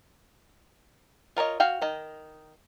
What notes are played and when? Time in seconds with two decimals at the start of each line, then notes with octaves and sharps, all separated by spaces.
1.37 F4 A#4 C#5 D#5
1.60 F#4 F5 G5
1.82 D#3 D#5